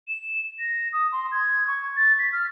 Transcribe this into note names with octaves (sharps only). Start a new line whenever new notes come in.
E7
A#6
D#6
C6
G#6
C#6
A6
B6
F6